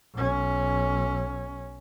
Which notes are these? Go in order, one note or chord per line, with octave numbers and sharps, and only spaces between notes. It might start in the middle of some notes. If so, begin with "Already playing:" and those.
B1 C#4